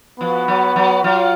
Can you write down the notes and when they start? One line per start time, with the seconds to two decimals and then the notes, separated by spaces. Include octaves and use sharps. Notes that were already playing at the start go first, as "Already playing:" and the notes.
0.20 F3 B3 F#4 B4
0.48 F#3
0.76 F#3
1.04 F#3 F4